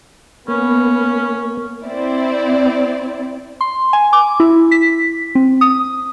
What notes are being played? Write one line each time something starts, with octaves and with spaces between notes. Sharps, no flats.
A#3 B3 C#4
C4 E4 D5
C6
G#5
D6
E4
B6
C4
D#6